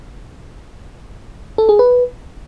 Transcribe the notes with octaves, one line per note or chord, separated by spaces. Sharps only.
A4
G#4
B4